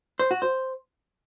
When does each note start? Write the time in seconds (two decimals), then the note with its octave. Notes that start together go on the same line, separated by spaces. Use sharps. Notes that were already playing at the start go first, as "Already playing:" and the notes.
0.19 C5
0.31 F#4
0.42 C5